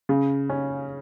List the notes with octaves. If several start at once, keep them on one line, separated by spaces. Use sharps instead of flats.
C#3
C#4